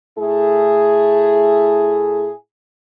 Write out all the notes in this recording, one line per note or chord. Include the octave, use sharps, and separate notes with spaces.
A2 A3 E4 G#4